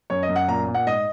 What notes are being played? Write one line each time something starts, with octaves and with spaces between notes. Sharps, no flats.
F#2 C#5
D#5
F#2
F#5
A#2 A#5
A#2
F#5
G#2 D#5